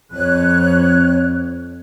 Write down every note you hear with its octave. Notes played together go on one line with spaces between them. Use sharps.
F2 C#5 F#6